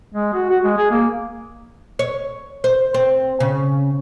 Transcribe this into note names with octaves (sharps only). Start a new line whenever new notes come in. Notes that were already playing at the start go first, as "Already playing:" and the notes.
G#3
F#4
F#4
G#3
G#4
A#3
C#5
C5
C4
C#3